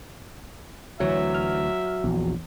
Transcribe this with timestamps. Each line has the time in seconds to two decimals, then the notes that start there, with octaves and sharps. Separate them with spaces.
1.00 D2 E3 F#3 E5
1.34 F6
2.04 A#1 E2